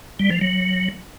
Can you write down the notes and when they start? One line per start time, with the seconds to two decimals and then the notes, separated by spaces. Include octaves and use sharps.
0.19 G3
0.30 F3
0.41 F#3